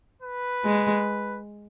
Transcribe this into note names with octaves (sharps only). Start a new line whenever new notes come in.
B4
G#3